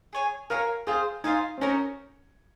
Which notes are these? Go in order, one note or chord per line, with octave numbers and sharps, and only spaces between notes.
G#4 C#5 G#5
F#4 A#4 C#5 F5 G#5
C4 F4 G#4 C5 F5
D#4 F4 C5 F5 G#5
C4
C#4 D#4 F#4 A#4